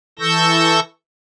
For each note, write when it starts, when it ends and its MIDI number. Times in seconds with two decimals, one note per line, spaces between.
0.19 0.80 52
0.19 0.80 69
0.19 0.80 85
0.19 0.80 88
0.19 0.80 91
0.19 0.80 94